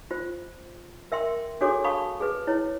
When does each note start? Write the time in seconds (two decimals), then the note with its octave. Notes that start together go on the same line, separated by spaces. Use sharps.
0.11 F4 C5
1.12 A#4 E5 G5 C6
1.61 D4 F#4 G#4 A4 C#5 D6
1.84 F5 A5 B5 C#6 D#6
2.20 G#4 B4
2.47 E4 C#5